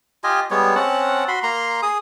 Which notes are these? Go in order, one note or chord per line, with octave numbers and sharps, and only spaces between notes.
F4 G4 D#5 G#5
G3 G#3 B3 C#5
C4 C#4 F#5 A5
F#4 B5 C6
A#3 A#5 C6
G#4 D#6